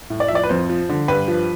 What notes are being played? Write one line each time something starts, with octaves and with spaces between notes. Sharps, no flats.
A2
D5
F3 E5
D5
B4
F2 C5
F3
D3
G2 B4
F3